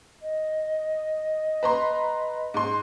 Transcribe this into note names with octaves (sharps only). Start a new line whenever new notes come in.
D#5
B4 A#5 C6
G#2 C6